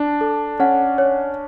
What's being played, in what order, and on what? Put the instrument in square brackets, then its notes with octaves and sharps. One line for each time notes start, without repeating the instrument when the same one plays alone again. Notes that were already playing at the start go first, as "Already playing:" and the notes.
Already playing: [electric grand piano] D4 [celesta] A5
[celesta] A4
[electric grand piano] C#4 [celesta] F#5
[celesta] C#5